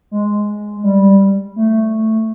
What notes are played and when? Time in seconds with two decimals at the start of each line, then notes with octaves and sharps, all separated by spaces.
0.11 G#3
0.84 G3
1.56 A3